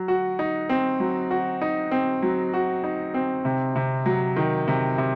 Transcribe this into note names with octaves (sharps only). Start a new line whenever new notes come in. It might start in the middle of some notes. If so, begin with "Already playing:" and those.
Already playing: F#3
F#4
D#4
C4
F#3
F#4
D#4
C4
F#3
F#4
D#4
C4
C3
C3
F#3
D#3
C3
C3